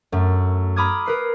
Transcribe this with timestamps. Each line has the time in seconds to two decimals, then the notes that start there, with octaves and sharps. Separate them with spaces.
0.12 F#2 A3
0.76 A#5 B5 D6 D#6 F6 G#6
1.06 A#4 B4 C7